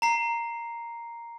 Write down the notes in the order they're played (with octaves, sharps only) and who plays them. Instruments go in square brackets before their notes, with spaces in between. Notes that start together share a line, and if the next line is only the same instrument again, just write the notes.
[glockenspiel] A#5 C7